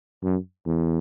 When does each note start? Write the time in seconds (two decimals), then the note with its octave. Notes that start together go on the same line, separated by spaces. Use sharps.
0.24 F#2
0.66 E2